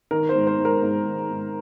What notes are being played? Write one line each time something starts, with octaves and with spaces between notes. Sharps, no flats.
D#3 A#4
C5
G#2
C5
G#2
A#4
G#2
D#3
G#2